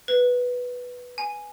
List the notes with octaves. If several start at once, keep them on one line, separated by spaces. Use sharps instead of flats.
B4
G#5